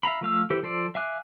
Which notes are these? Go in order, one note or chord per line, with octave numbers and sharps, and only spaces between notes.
E5 F5 A#5 B5
F3 A3 F5 E6
E3 G4 A4 C5
F3 A4 C5 D5
E5 F5 G#5 D6 F#6